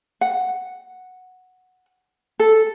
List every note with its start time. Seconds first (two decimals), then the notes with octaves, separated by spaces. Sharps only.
0.21 F#5
2.39 A4